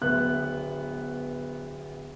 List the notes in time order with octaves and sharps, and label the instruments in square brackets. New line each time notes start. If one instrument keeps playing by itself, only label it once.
[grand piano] D1 B3 E5 F#6